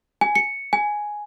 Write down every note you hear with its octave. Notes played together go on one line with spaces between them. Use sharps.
G#5
C#7
G#5